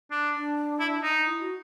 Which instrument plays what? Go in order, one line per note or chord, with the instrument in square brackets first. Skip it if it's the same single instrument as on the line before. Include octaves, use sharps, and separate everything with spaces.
[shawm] D4
[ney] D4
[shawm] E4
D#4
[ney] E4
F#4